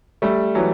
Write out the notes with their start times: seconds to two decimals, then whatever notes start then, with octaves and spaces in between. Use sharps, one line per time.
0.22 G3 A3
0.55 E3 F#3